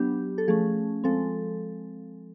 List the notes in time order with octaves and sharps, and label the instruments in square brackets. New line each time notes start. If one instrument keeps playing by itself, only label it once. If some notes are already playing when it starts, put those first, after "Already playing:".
Already playing: [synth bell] F#3 B3 D4 G4
A4
F3 A3 C#4 G#4
F3 G#3 C4 A4